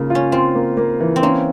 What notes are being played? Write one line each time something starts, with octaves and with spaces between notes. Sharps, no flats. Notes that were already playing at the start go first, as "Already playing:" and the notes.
Already playing: C#3 A#3 F4
C#4 F4
C4 F4
A#3
A#3
E3
C4
A#3 C#4